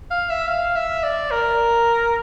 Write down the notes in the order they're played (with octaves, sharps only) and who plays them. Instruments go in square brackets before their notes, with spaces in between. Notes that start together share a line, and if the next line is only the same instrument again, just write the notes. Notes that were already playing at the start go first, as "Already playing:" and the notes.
[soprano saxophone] F5
E5
F5
E5
D5
A#4